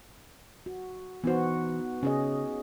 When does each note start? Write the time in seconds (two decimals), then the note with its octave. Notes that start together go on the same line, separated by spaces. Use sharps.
0.66 F#4
1.24 E3 B3 D#4 F#4 C5
2.03 C#3 C#4 G#4 D#5